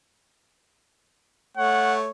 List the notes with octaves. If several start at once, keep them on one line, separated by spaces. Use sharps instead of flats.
A3 C#5 F#5